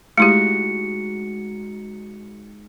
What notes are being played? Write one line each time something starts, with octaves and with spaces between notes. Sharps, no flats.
G#3 A3 D#4 E4 F#4 G4 C#7